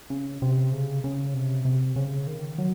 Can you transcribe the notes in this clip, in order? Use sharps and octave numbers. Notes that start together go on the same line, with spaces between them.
C#3
C3
C#3
C#3
C3
C3
C#3
D#3
F#3